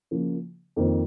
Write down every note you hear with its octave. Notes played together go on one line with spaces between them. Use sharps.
C#3 F3 A#3
F2 D#3 A#3 F4 C5